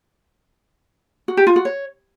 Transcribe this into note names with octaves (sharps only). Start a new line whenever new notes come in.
F#4
G4
F4
F#4
C#5